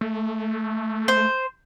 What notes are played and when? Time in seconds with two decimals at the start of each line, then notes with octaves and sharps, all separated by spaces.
0.01 A3
1.08 C5